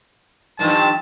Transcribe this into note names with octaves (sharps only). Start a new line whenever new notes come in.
G2 D#3 F3 A5